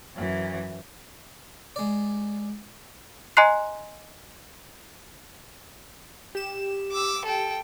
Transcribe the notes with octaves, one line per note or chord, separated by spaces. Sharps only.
F#2 E3
G#3 D5
D#5 G#5 A#5 C6 F#6 C7
G4 E7
D6 E6
A4 G5